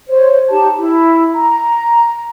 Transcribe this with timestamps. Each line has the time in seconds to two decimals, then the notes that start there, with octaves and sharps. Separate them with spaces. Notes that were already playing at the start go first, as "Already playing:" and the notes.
0.07 C5 C#5
0.50 D#4 G4 A5
0.78 E4
1.34 A#5